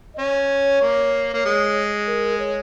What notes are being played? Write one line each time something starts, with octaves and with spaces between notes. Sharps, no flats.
D#5
C#4 C#5
A#3
A#3
G#3
A#4
C#5